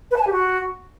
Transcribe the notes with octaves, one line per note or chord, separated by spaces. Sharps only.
B4
A5
G#5
G4
F#4